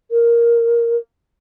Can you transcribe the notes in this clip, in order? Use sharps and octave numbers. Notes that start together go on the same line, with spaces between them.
A#4